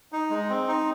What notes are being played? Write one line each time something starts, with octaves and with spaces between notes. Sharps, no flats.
D#4
G#3
C4
D#4